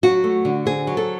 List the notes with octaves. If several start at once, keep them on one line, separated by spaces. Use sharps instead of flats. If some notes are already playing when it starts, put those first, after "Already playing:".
F#3 F#4
A3
D3
C4 G#4
F#3
A4